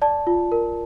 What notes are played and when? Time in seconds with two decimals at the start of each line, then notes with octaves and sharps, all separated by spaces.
0.02 D5 A5
0.27 F4
0.52 A#4